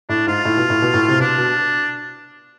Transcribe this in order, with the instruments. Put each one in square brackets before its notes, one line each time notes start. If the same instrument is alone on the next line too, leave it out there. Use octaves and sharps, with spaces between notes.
[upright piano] A2 [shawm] D4
[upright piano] G#2 [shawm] F4
[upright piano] A2
B2
A2
B2
A2
C3
[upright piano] B2 [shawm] D4
[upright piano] B2